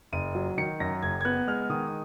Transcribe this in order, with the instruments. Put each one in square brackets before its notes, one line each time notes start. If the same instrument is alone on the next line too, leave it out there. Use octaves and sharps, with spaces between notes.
[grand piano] F#1 D#7
F#3
D#3 C#7
F#2 A#6
F#1 G#6
G#6
B3 F#6
G#3 F6
F6
D#3 D#6
D#6